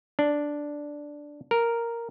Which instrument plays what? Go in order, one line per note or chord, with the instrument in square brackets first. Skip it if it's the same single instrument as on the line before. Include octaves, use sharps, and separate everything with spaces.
[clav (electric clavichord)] D4
A#4